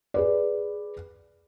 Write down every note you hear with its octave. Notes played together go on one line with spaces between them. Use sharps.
G#4 B4 D5